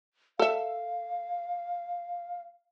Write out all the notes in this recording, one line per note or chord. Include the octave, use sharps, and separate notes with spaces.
A4 E5 F5